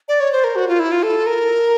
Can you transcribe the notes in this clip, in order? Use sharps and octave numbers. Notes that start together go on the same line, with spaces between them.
D5
C#5
C5
A#4
F#4
F4
E4
F4
A4
A#4